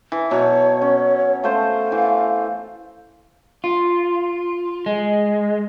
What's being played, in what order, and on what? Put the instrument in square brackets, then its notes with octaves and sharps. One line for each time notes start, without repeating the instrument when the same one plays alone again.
[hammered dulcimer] E3
[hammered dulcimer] B2 F#3 A5 [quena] C#5
[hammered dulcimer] C#4
[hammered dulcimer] A3 C5 [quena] F5
[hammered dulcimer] E3
[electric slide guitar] F4
G#3